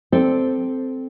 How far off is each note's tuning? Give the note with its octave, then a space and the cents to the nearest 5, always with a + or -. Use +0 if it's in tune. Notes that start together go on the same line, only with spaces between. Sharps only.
C4 -5 A4 +0 D5 +20